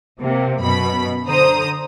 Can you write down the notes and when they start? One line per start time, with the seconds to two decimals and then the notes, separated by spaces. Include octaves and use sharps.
0.20 C3 A#3
0.61 F#2 B2 B5
1.27 D3 C5 A#5 D#6